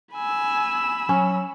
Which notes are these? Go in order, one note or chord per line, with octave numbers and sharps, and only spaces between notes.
G#5 B5 E6
F#3 C#4